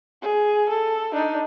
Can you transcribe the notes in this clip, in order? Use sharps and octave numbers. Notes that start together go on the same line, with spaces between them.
G#4
A4
D4 D#4